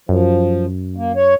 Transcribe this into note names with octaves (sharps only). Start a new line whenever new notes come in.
F#2 F3
A#3
C#5